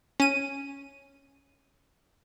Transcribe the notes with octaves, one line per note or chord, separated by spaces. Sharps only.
C#4 D#7